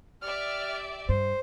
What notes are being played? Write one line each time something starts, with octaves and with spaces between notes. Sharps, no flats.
G4 D5 E5 F6
G2 C5